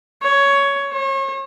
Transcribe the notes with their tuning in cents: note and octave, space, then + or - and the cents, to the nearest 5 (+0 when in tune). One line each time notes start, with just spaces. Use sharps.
C#5 +10
C#5 -40